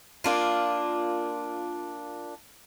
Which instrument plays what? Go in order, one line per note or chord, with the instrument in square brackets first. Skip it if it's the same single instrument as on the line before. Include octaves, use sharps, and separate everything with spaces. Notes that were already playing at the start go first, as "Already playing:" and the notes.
[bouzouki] A#3 D4 F4